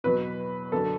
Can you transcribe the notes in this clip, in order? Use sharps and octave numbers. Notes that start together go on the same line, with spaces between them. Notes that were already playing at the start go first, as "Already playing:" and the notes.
E2 B2 F#3 B4
F#2 D3 F#3 A4